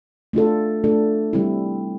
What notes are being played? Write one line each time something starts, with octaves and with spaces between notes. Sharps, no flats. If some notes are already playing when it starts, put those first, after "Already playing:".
A3 D4 F4 A4
A3 D4 F4 A4
G3 C4 E4